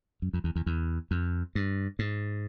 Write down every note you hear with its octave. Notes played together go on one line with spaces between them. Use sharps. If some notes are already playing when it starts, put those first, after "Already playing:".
F#2
F2
E2
E2
E2
F2
G2
G#2